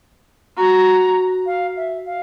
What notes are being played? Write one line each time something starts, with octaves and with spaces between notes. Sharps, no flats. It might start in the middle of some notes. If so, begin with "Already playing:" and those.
F#4 A#5
F5
E5
F5